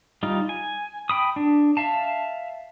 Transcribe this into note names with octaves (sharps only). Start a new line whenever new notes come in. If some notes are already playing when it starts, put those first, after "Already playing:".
G3 D#4 F4
G#5
G5 B5 D#6
D4
E5 F5 A5